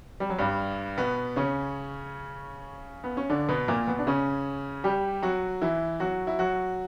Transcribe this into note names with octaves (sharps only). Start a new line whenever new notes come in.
G3
F#3
G2 G3
B2 B3
C#3 C#4
B3
C#4
D3 D4
B2 B3
A#2 A#3
B2 B3
D4
C#3 C#4
G3 G4
F#3 F#4
E3 E4
F#3 F#4
E4
F#3 F#4